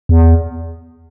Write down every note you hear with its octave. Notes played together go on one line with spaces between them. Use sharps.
E2